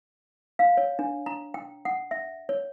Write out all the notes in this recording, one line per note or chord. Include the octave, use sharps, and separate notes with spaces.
F5
C#5
D4
A#5
G5
F#5
E5
C#5